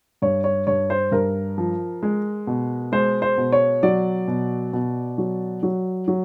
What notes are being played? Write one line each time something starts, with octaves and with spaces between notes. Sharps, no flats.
G2 C#5
C#5
G2 C#5
C5
G2 A#4
F3
G#3
B2
G#3 C5
C5
B2
C#5
F#3 D5
B2
B2
F#3
F#3
F#3